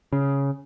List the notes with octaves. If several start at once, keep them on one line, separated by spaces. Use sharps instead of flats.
C#3